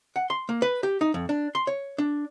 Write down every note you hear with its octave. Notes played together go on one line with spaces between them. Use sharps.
F#5
C6
A#3
B4
G4
D#4
F2
D4
C6
C#5
D4